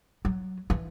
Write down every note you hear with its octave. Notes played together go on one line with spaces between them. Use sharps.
F#3
E3